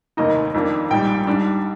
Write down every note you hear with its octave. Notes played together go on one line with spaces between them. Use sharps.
F1 D#2 D#3 A#3 D#4 D#5
F2 D#3 A#3 D4
A#1 G#2 G3 G5
G#2 G3 D4